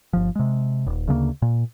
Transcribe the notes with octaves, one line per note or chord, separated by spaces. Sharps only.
G1 F3
C3 G#3
D#1
D2 C#3 A3 A#3
A#2